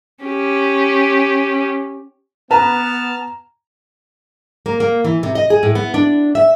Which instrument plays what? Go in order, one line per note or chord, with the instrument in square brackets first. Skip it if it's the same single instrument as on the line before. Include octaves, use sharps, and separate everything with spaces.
[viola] C#4 G4
[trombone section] B3 [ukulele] B4 [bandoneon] A5 F6 [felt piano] A#5
[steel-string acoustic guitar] A#3
A#3
E3
C3
D#5
G#4
A2
B3
D4
E5